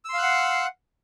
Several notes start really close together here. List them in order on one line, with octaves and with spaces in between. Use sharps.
E6 C6 F5 F#6 F#5